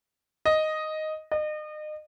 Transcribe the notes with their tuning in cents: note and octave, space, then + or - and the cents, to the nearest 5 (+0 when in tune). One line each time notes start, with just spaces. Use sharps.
D#5 +0
D#5 -35